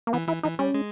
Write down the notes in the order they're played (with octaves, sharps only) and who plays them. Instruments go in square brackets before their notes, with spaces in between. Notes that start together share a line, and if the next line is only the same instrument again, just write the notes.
[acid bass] A#3
[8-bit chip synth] E3 [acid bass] B3
[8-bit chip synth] E3 [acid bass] E4
[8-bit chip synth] E3 [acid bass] D#4
[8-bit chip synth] G3 [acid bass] C#4
[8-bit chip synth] G#3